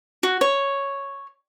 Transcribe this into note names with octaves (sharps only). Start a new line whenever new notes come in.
F#4
C#5